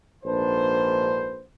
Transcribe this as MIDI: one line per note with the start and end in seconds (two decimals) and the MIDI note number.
0.24 1.41 34
0.24 1.41 44
0.24 1.41 62
0.24 1.41 71
0.24 1.41 72